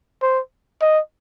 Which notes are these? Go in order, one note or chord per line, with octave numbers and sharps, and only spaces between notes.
C5
D#5